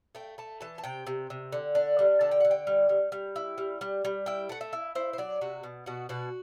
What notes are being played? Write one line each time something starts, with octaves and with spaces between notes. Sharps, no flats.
A3 G5
A3 A5
E3 A5
A5
C3 G5
C3
C3
D3
D4
G3
D3 A5
G5
D3 F#5
G5
G3
G3
G3
E4
G3
G3
G3
E4 G5
A3 F#5
E5
E4
E4 C5
C5
F#3 D5
C3 F#4
B2
B2 F#4
B2 F#4